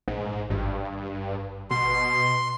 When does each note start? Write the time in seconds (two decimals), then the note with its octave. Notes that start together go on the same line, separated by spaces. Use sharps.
0.08 A#1 G#2
0.50 G#1 G2
1.71 B2 C6